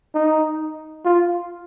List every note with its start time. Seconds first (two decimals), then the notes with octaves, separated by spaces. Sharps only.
0.15 D#4
1.05 F4